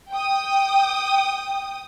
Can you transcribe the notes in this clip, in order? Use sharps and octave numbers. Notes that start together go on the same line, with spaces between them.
G5 D#6